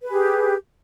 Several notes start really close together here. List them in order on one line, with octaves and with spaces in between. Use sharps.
B4 G#4 G4